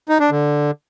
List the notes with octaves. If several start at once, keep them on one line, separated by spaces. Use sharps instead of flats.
D#4
D4
D3